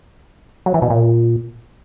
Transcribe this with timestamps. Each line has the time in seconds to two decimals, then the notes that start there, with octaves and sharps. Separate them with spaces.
0.66 F#3
0.74 E3
0.82 B2
0.90 A#2